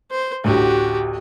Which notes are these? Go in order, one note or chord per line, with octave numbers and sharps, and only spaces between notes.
C5
A1 D2 F#4 G4